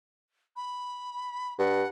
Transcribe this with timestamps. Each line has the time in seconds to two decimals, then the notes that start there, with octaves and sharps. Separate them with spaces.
0.56 B5
1.59 G2 F#5